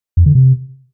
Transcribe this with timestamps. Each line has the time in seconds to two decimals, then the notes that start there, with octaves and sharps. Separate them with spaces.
0.17 F2
0.26 D3
0.35 C3